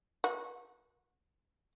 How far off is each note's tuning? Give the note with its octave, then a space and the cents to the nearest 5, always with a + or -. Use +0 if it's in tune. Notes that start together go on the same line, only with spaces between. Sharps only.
F#4 -25 B4 -40